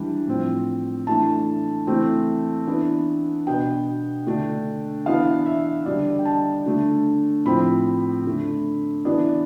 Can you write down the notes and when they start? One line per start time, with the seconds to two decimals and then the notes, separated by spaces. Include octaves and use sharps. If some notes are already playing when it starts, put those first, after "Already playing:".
Already playing: E3 G3 D4
0.27 A2 F3 C4
1.07 E3 A3 D4 A5
1.87 E3 A3 C4
2.67 E3 B3 D4
3.47 B2 B3 D4 G5
4.26 D3 A3 D4
5.06 E3 B3 D4 F5
5.46 E5
5.86 D3 G3 D4 D5
6.19 G5
6.25 A5
6.66 D3 A3 D4
7.46 A2 F3 C4 B5
8.25 D3 A3 D4
9.05 E3 B3 D4 D5